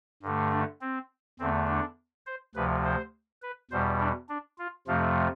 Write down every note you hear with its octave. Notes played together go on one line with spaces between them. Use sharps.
G2 D3 A3
D4
C4
E2 D3 A3 C4
D4
C5
D2 C3 F3 B4
C5
B4
E2 B2 G3 C5
D4
D4
F4
F2 C3 F3 A3 F4